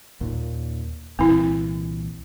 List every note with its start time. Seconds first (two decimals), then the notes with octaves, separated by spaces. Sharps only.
0.21 D#2 A#2
1.19 C2 A#2 E3 C4 E4